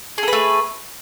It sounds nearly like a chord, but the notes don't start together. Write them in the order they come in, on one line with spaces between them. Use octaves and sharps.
G#4 A4 B4 A3